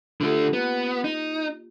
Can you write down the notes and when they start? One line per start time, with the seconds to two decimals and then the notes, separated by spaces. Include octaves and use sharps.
0.21 D3 A3 F4 G4
0.53 A#3 B3
1.04 D#4